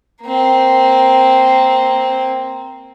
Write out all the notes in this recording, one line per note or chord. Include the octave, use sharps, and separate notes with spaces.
A#3 C4